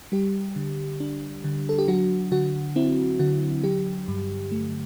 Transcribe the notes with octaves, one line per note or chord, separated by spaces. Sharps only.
G3 G4
D3
D4
D3
A4
G4
F#3 F#4
D3 F#4
C4 E4
D3 F#4
F#3 G4
G2
A3